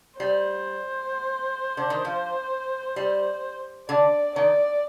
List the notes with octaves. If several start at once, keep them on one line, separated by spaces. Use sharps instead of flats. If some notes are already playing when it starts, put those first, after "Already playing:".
G3 C5
D3
D#3
F3
G3
D3 D5
D#3 D5